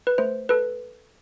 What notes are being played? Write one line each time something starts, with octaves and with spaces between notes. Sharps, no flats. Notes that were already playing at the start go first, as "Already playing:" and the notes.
B4
A3 C5
A4 B4